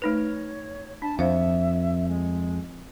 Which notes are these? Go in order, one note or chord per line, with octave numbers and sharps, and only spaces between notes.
A3 D#4 B4 C#5
D4 A5
F2 C5 E5 F5
G#3